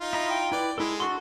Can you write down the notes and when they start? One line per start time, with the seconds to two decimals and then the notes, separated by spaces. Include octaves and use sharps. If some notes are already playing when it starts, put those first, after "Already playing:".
0.01 D#4 F4
0.13 E4 D#5 A#5
0.30 G5
0.52 E4 B4 D5
0.78 G#3 E4 A4
1.00 D4 F#4 A4 C6